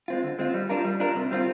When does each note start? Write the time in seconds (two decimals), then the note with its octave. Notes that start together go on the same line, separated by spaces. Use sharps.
0.08 G#3 C4 F4
0.24 D3
0.39 G#3 C4 F4
0.54 G3
0.69 D4 F4 A#4
0.84 G3
1.00 D4 F4 A#4
1.15 C3
1.31 G3 C4 F4